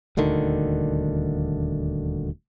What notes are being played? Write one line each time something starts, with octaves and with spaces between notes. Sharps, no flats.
D#1 D2 D3 D#3